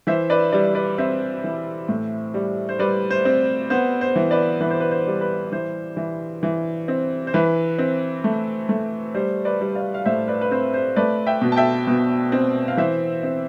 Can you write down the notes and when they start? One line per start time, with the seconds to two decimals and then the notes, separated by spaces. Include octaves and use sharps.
0.07 E3 C5 E5
0.30 B4 D5
0.52 G3 B4 D5
0.75 B4 D5
0.98 C4 C5 E5
1.44 E3
1.89 A2
2.34 G3
2.69 C5
2.79 G3 B4 D5
3.10 C5
3.25 C4
3.70 B3 C5
4.01 C5
4.16 E3
4.31 B4 D5
4.61 E3 B4
4.71 C5
4.80 B4
4.91 C5
5.07 G3
5.21 B4
5.52 E3 C5
5.97 E3
6.43 E3
6.88 C4
7.27 C5
7.34 E3 B4
7.78 C4
8.24 A3
8.69 A3
9.14 G3 C5
9.45 B4 D5
9.61 G3
9.75 D5 F5
9.94 F5
10.05 A2 C5 E5
10.28 B4 D5
10.41 B4
10.51 C4 C5
10.74 C5
10.96 A3 B4 D5
11.26 E5 G5
11.41 B2
11.52 A5
11.56 E5 G5
11.87 B2
12.32 C4
12.68 F5
12.77 E3 C5 E5
13.23 C4